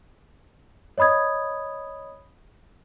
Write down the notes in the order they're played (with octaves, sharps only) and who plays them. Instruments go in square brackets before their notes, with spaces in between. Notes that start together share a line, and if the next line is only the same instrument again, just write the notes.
[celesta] C#5 D#5 B5 D#6 G#6